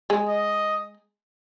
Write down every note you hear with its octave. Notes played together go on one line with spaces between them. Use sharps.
G#3
D#5